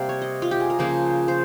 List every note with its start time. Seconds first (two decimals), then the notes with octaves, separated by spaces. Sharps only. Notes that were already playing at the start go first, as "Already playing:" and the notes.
Already playing: C3 G3 A#3 F5
0.09 C#5
0.22 D#5
0.42 F4
0.51 G4
0.60 G#4
0.70 A#4
0.79 C#3 F3 A#3 C5
1.28 C5